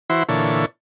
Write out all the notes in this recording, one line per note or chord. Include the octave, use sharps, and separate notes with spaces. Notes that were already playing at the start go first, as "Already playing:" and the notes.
E3 E4 F#4 C5 C6
A#2 D3 E3 A4 C#5